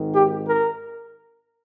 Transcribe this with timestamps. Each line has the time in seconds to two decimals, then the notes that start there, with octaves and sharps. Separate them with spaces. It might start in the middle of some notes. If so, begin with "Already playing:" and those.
Already playing: G#1 G#2 D#3
0.13 G4
0.47 A#4